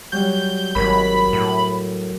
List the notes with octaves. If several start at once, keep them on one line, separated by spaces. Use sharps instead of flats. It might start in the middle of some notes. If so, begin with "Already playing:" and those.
F#3 G3 G6
G#1 F#3 A#4 B5
A2